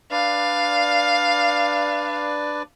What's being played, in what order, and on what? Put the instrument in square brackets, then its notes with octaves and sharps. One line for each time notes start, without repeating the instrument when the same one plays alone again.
[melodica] D4 B4 D5 [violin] F5